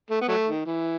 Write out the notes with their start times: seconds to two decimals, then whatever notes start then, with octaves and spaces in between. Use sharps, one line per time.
0.10 A3
0.21 B3
0.28 F#3 A3
0.47 D#3
0.66 E3